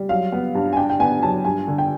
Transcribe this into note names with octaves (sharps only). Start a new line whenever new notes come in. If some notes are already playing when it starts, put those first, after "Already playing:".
Already playing: G3
F#3 F5
B3
G2
G#5
D4 G5
G5
B3 G#5
F#3 A5
G2 G#5
D3
G5